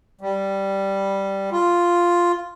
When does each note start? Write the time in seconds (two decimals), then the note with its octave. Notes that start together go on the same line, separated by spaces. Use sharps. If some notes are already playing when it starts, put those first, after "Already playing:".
0.21 G3
1.52 F4